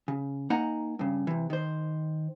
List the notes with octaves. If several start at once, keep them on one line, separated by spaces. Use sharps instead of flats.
C#3
A#3 D#4 F#5 G#5 A#5
G2 C#3
C3 E3
D#3 C5